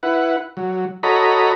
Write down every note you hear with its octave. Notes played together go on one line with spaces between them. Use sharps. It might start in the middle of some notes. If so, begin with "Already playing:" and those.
E4 B4 F#5
F#3
F#4 A4 C#5 D#5 A#5 B5